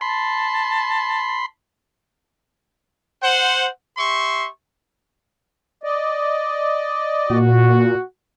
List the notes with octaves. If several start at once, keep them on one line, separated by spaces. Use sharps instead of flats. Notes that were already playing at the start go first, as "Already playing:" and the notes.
A5 B5 C6
C5 F#5
G4 E5 C6 C#6
D5 D#5
A#2 F#4